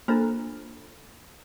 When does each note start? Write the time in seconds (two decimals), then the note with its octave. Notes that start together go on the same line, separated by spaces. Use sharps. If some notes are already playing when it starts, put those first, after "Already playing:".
0.08 A#3 D4 F4 A4 C5